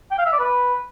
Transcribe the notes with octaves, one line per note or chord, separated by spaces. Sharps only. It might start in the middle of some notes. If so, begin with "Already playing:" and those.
G5
F5
E5
D5
B4